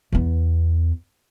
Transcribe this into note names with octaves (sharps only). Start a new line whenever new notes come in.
E2 B3